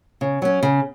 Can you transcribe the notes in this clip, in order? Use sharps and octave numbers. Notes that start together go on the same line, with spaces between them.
C#3
F#3 C#4
C#3